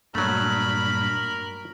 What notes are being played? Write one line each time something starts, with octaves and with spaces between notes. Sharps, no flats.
G2 A#2 F#3 A3 D4 A#4 B5